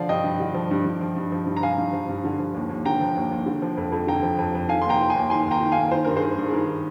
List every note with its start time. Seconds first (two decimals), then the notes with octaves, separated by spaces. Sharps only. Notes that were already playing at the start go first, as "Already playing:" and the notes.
Already playing: D3 F3 D5 F5
0.09 G2 D#5 G5
0.24 G2
0.40 D3
0.54 F3
0.71 G2
0.86 G2
1.01 F3
1.16 G2
1.32 F3
1.46 G2
1.57 A#5
1.63 F3 F5 G#5
1.78 G2
1.93 F3
2.09 G2
2.24 D3
2.39 F3
2.54 D#2
2.69 D#2
2.85 D3 G5 A#5
3.01 F3
3.16 D#2
3.32 D#2
3.46 D3
3.62 F3
3.77 F2
3.92 F2
4.07 D3 G5 A#5
4.23 F3
4.38 F2
4.54 F2
4.69 D#3 F5 G#5
4.82 D#2 C6
4.89 G5 A#5
5.00 D#3
5.10 G#5 C6
5.16 D#2
5.30 D#3 G#5 C6
5.46 D#2 G5 A#5
5.61 D#3
5.72 D#2 F5 G#5
5.91 D#3 C5
6.05 G2 A#4
6.16 G#4 C5
6.22 D#3
6.39 G2
6.48 G#4
6.53 D#3 A#4